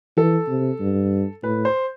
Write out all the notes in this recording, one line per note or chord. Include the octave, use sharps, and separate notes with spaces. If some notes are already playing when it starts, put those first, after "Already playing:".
E3 A4
C3
G2
A2 B4
C5